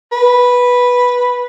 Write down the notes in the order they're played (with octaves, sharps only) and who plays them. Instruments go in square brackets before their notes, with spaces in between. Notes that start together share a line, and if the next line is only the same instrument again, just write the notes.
[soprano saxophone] B4